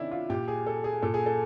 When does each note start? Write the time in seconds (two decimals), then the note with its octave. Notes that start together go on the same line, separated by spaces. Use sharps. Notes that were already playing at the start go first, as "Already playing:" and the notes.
Already playing: C3 D#3 C#4 D4 E4
0.11 F4
0.29 A#2 G4
0.48 G#4
0.67 A4
0.84 G#4
1.02 A#2 A4
1.14 G#4
1.26 A4